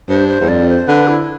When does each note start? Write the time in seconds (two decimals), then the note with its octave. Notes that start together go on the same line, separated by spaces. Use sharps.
0.09 G2 C5
0.29 C5
0.41 E2
0.48 F2 D5
0.69 C5
0.88 D3 B4
1.08 E4